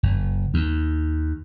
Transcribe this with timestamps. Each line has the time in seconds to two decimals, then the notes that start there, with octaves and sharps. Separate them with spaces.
0.03 F#1
0.54 D#2